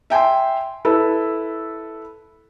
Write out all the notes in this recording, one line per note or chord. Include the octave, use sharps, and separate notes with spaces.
E5 G5 G#5 C6
E4 A4 B4